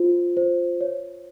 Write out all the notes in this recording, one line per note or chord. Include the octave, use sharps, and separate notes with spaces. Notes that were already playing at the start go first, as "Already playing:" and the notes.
Already playing: F4 C5
C5
C#5